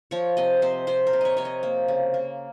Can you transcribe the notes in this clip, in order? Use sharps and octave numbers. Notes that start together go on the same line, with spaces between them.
F3 C#5
C3 D#5
C3 C5
C3 C5
A#4
C3
C#5 D#5
C3 C#5
D#5
A#3
C#3
A#3